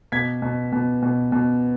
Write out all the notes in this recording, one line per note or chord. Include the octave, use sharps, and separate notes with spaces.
B2 G#6 B6
B2
B2
B2
B2